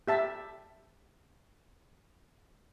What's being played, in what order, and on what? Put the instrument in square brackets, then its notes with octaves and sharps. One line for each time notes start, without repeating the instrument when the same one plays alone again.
[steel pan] G4 E5 A5